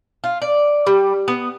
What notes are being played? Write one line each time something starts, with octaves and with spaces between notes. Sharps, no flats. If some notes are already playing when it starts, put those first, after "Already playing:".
F4
D5
G3
B3